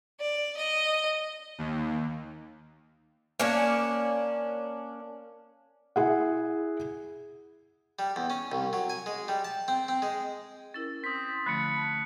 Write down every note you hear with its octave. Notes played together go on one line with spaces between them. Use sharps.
D5
D#5
D#2
A#3 C#4 D4
E4 G#4 F#5
G3
E2
C#4
C2
F#3
G#5
G#3
G3
A5
C4
C4
G#3
C#4 E4 A#4 A6
C4 D#6 B6
D3 F3 A3 B5 F#6 C#7
A5